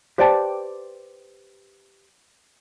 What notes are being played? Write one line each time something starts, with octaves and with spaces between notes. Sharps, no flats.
G4 B4 C5 D5 G5 A5